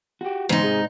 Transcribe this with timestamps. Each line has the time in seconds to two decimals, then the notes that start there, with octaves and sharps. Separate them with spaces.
0.21 F#4 G4
0.49 E2 G#2 C#3 D#4 C5
0.63 C3 G#4